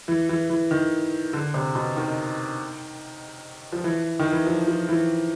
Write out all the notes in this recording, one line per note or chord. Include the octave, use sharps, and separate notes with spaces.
E3
E3
E3
D#3
D3
C3
B2
D#3
F3
E3
D#3
E3
F3
F3
E3